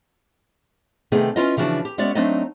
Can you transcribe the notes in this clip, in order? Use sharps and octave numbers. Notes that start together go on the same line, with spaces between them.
C3 D#3 A3 B3 D#4 G#4
C#4 E4 F4 B4 D#5
C#3 E3 F3 D4 F#4
G4
G#3 B3 C#4 F#4 D5 E5
F#3 A3 C4 D4 D#4 D#5